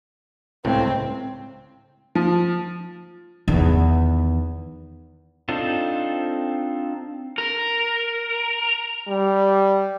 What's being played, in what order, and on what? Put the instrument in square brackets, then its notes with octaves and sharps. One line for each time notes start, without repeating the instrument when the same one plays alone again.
[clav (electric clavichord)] C#2 A2 [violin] C4
[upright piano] F3
[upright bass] E2 D#3
[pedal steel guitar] C4 D4 D#4 F4 A4
[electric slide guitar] A#4
[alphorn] G3